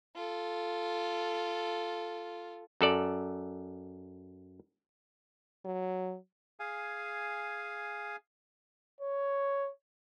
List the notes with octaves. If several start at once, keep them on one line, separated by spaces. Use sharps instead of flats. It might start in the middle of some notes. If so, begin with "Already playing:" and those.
F4 A4
F#2 A4 D5
F#3
G#4 F5 G#5
C#5